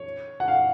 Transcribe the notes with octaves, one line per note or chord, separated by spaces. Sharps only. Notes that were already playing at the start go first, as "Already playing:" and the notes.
Already playing: C#5
F#5
F5